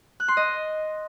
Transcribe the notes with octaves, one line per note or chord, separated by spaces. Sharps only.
F#6
C6
D#5